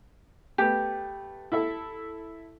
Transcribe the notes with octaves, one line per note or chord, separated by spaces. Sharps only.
A3 B3 G4
E4 A4 E5